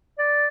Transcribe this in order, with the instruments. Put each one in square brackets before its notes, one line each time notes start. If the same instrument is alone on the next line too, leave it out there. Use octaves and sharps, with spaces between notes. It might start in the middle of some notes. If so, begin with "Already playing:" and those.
[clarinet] D5